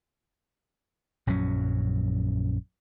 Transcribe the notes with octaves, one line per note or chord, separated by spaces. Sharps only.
A#1 F#2 F#3 C#4